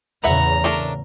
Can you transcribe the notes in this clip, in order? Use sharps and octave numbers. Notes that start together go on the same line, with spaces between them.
E2 A2 C#3 B4 E5 F#5 A#5
A3 D4 A#4